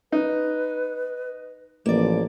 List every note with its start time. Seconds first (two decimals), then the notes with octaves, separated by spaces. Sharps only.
0.12 D#4 B4
1.86 A1 F3 A#3 D5